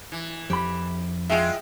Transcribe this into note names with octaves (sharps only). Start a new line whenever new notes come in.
E3
F2 G4 B5
G#3 F4 E5 F#5 G5